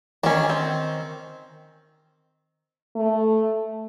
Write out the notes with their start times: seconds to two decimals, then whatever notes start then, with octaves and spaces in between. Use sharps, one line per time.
0.24 D#3 C#4 D4
0.50 C4
2.96 A3